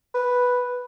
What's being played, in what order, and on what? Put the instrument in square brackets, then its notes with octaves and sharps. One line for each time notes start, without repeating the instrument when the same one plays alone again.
[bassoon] B4